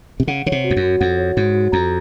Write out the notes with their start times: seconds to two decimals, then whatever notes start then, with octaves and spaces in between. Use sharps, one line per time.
0.20 C3
0.27 C#3 F#5
0.46 C#3 C#5
0.52 C3
0.64 F#4
0.70 F2
0.77 F#2
0.82 F#4
1.00 F2 F#5
1.18 C#5
1.37 G#2 F#4
1.54 F#4
1.72 F2 A#5